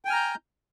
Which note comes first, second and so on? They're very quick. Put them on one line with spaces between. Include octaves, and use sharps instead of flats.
G5 G#5 F6 A#5 G6